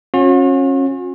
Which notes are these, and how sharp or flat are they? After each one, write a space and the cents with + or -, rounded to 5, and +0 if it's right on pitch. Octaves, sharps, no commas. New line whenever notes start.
C#4 -30 F#4 -45